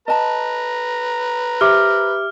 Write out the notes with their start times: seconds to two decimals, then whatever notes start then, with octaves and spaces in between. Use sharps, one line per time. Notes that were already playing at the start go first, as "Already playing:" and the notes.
0.08 B4 D#5 A5 A#5
1.61 G4 C5 E5 D6 F6